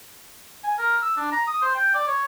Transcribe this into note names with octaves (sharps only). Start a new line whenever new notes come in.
G#5
A#4
E6
D4
A#5
D#6
C5
G5
D5
C#5